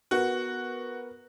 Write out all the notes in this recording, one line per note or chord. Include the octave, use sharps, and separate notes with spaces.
B3 F#4 A#4